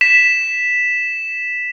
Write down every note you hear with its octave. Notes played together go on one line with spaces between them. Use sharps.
B6 E7